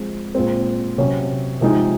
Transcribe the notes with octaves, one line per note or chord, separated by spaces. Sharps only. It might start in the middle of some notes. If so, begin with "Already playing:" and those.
Already playing: F3 G#3 C4
A#2 G#3 C4
C3 F#3 C#4
C3 F3 G#3 D#4 G#4